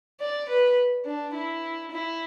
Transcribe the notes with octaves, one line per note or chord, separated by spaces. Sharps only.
D5
B4
D4
E4
E4